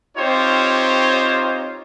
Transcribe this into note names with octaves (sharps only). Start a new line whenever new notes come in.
C4 D#4 F4 G4 C5 C#5